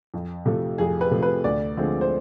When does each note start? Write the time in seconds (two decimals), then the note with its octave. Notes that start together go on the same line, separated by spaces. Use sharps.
0.14 F2
0.46 C3 F3 A3
0.78 F2 G#4
1.01 B4
1.11 C3 F3 A3
1.22 B4
1.44 D2 D5
1.77 D3 F3 G#3 C4
2.01 C5